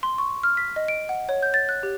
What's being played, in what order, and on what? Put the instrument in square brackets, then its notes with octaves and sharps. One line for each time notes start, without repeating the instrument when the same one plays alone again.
[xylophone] C6
C#6
F6
B6
D#5
D7
F#5
C#5
G6
A6
F#6
G4